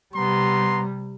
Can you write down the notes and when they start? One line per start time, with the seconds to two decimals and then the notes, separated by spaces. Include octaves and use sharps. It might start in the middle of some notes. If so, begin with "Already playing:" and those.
0.15 C3 G3 B3 A#5 C6